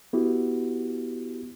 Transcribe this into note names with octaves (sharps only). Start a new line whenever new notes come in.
B3 E4 F#4 G4